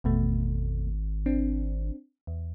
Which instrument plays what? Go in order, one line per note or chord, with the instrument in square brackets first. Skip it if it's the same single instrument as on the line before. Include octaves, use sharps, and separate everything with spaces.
[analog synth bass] G#1 [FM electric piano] E2 B2 A3
[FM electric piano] C4 D4
E2